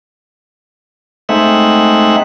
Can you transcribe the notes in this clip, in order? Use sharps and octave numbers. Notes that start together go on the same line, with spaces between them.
G#3 A3 C4 D#4 E5 F#5